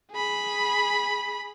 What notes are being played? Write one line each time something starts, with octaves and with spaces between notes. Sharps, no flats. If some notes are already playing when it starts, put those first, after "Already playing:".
G#4 B5